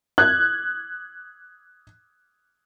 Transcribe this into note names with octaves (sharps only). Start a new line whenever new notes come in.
F#6 G#6